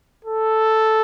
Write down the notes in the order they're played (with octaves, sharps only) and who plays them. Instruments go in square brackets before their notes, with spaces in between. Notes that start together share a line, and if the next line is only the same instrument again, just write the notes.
[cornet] A4